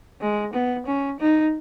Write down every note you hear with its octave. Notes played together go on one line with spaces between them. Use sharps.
G#3
B3
C#4
D#4